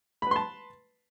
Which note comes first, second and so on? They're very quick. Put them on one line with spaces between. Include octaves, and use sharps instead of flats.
B5 B4 C6 A5